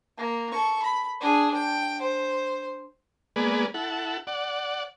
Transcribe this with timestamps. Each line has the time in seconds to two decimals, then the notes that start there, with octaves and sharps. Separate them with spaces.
0.18 A#3
0.52 A4 C#6
0.83 B5
1.20 D4 G#4
1.55 G5
2.01 C5
3.36 G#3 A#3 B3 G#4 B4 D5
3.74 E4 A4 F#5
4.27 D5 F#5